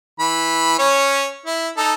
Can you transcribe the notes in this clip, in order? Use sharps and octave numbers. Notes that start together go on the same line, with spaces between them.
E3 B5
C#4 C#5
E4
D#4 A4